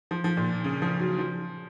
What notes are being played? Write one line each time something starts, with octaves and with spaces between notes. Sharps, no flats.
F3
F3
A#2
C#3
F3
F#3
F3